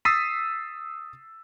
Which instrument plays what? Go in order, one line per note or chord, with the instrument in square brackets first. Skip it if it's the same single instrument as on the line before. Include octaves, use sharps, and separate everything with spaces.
[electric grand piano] D#6 E6 A6 B6 C7 D#7